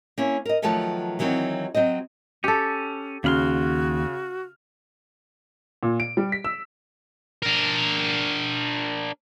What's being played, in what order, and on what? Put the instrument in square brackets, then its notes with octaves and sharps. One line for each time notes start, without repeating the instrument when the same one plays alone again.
[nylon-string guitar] A#3 C#4 E4
A#4 D#5
D#3 F3 F#3 A3 B4 A5
D#3 E3 F#3 C4 F#4
F#3 C4 C5 D#5
[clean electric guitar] C#4 [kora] G4 A4
[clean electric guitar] D#2 B5 C6 [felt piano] C#3 F6 [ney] F#4
[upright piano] A#2
D7
G3
B6
E6
[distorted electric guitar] D4 A#4